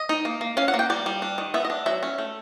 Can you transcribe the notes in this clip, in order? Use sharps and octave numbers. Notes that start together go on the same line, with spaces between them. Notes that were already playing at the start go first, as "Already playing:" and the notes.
Already playing: D#5
D#4
A#3
A#3
C#4 F5
F#5
A#3
G5
G3 D5
G3
D4
D#3
B3 E5
D#5
D4
F#3 E5
C#4
A3